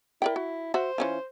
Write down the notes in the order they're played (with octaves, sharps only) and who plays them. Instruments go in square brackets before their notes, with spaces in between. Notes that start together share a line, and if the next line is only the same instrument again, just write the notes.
[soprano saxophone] E4 [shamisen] A#4 D5 G5
[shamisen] F#4
[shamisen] F#4 E5 [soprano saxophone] C5
[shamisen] E3 C#4 F4